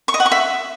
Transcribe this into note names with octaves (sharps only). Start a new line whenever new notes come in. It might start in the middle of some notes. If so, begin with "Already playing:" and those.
C#6
D#5
F#5
C#6
E5